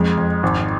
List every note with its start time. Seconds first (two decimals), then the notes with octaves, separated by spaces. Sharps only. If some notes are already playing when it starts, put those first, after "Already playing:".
Already playing: F2 G#3
0.17 F2
0.43 G#1